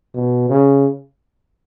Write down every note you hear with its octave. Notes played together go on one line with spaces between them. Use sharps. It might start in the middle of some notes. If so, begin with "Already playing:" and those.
B2
C#3